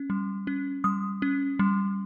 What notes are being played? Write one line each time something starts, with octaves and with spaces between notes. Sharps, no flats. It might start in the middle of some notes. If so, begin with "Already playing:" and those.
Already playing: C#4
G3
C#4
G3 D#6
C#4
G3